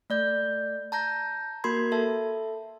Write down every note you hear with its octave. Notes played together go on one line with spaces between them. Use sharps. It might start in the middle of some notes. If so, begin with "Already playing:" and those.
A3 D5 G6
A5 A#5 G6 A#6
A#3 F#4 A#4 B5 C6 G#6
A4 E5 A5